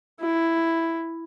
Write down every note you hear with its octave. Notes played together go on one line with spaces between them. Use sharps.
E4